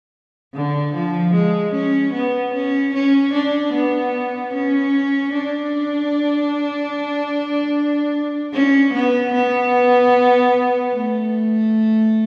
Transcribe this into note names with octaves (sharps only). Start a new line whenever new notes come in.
D3
F3
G#3
C#4
B3
C#4
C#4
D4
B3
C#4
D4
C#4
B3
B3
A3